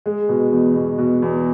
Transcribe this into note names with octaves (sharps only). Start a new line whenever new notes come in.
G#3
B2
E2
B2
B2
E2